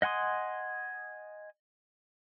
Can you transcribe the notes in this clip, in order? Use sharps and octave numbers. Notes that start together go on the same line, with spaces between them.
D#5 F#5 G#5 C6 D#6